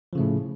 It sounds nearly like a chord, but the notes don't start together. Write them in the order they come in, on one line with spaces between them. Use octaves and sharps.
F3 C#3 A3 A2